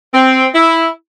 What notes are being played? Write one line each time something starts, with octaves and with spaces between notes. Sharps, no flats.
C4
E4